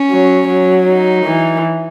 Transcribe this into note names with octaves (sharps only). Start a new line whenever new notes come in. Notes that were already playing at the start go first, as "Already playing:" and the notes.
Already playing: C#4
F#3
F#3
D#4
E3